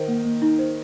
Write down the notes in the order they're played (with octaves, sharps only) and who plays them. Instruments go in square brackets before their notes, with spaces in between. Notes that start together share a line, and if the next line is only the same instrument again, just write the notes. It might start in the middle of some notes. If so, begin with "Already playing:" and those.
Already playing: [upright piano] D#3 [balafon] C5
[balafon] A#3
A#3
D#4
C5